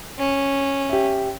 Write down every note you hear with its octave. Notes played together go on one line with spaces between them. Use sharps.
C#4
G4 E5